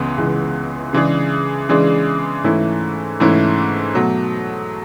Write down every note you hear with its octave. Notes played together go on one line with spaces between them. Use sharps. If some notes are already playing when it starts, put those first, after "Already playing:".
Already playing: C#2 C#3 E3 G#3 B3
C#2 C#3 E3 G#3 B3
C#3 E3 G#3 D4 G#4
C#3 E3 G#3 D4 G#4
G#2 E3 A3 C#4 E4
G#2 E3 A3 C#4 E4
B2 F#3 A3